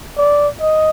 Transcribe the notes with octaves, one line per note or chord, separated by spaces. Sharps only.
D5
D#5